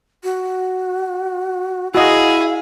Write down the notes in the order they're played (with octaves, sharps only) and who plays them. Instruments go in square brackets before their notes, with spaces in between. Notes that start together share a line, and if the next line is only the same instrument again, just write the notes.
[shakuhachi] F#4
[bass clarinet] E4 [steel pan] F#4 D#5 [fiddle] G#4 [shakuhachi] F5